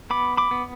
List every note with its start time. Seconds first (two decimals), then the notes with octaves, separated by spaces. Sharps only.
0.10 B3 B5 D6
0.37 B5 D6
0.51 B3